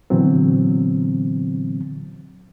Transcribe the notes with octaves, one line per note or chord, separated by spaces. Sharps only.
A#2 D3 E3 F#3 B3 C4